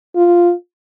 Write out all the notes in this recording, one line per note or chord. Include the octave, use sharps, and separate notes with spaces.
F4